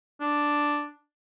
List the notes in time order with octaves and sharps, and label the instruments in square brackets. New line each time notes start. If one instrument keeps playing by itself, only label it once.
[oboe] D4